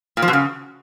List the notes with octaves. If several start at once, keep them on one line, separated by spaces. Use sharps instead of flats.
A#2
F3
B2
C#3